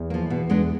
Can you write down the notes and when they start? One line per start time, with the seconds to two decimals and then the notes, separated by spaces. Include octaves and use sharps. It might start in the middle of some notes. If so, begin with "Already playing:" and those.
Already playing: E2
0.10 F3 A#3
0.30 B2
0.50 G#3 B3 D4